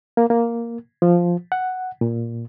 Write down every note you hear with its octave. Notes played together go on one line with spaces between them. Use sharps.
A#3
A#3
F3
F#5
A#2